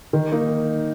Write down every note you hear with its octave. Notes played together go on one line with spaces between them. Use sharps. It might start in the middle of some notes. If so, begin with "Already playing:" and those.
D#3
A#3 D#4